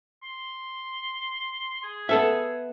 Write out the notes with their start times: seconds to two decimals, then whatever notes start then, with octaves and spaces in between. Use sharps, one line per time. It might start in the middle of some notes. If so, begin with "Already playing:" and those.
0.23 C6
1.83 G#4
2.09 B3 A4 E5